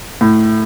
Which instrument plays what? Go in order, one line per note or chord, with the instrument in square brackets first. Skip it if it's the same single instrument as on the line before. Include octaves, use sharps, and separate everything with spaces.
[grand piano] A2